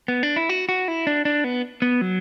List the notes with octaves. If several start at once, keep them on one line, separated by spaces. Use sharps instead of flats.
B3
D4
E4
F#4
F#4
E4
D4
D4
B3
B3
F#3